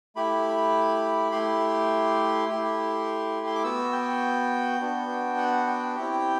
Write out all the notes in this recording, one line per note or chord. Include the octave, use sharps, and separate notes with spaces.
A3 E4 G4 B5
A3 E4 G4 C6
A3 E4 G4
C6
D6
B3 F#4 E6
G5
B3 D4 F#4
F#5
G5
C4 E4 G4